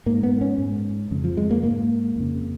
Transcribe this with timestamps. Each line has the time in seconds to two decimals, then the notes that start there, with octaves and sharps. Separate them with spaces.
0.06 G#2 A#3
0.23 B3
0.41 C#4
0.58 G#2
1.11 F2 C#3
1.24 F3
1.37 G#3
1.51 A#3
1.63 G#2 A#3
2.16 F2 C#3